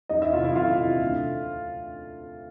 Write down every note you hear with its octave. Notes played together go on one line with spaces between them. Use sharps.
E2 D#4 D#5
E4 E5
C3 E3 F4 F5
E4 E5
E2 F4 F5
C3 E3
D2